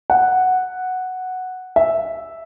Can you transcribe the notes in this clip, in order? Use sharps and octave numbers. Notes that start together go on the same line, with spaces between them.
F#5
E5